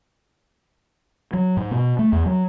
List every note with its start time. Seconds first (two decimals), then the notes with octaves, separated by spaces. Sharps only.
1.33 F#3
1.57 G#2
1.71 B2
1.99 A3
2.12 E2
2.26 F#3